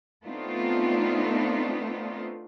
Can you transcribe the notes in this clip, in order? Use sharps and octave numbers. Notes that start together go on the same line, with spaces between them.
A3 B3 C4 D4 D#4 F4